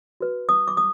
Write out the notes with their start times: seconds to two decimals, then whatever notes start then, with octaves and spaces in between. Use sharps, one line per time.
0.20 F#4 B4
0.49 D#6
0.68 D6
0.77 D#6